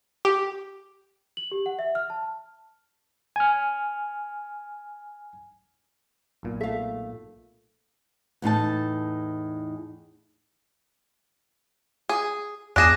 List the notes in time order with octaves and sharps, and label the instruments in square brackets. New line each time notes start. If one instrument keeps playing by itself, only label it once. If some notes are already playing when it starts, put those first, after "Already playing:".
[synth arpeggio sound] G4
[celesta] F#7
G4
F#5
E5
F6
A5
[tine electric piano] G#5 F6
[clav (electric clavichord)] B1 A#2
[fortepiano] A3 [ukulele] E5 F5
[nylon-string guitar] E2 A2 D#4 A5
[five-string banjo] G#4
[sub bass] E2 [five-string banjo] D4 G#4 [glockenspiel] F#6 A#6 E7